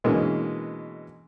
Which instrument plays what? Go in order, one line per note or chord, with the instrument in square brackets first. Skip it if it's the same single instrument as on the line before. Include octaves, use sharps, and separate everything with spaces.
[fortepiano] B2 D3 E3 G#3 A#3 C#4